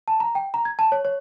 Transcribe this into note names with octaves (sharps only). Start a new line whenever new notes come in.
A5
A#5
G5
A#5
G#6
A5
C#5
C#5